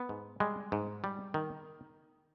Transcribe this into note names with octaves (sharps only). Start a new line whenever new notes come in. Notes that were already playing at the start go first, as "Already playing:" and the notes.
Already playing: B3
G#2
G3 G#3
G#2
G3
D#3